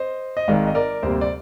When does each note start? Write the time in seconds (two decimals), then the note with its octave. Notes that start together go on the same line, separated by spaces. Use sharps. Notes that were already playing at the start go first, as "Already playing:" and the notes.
Already playing: C5 D#5
0.37 D#5
0.48 G#1 G#2 D#3 G#3 D5 F5
0.67 D#5
0.75 A#4 D5
1.03 D2 C3 G3 A#3 C5
1.21 D5